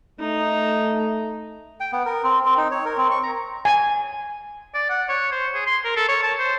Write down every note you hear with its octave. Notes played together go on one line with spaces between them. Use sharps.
A3 D#4
G5
B3
A#4
C4
C4
D#4
C#5
A#4
C4
C#6
A#5
G#5
D5
F#5
C#5
C5
G#4
C6
A#4
A4
C#5
A5
C5